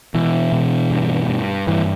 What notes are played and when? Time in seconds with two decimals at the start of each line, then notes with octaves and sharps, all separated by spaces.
0.14 B2 E3
0.52 B2
0.91 G2
1.29 G2
1.67 G2 E3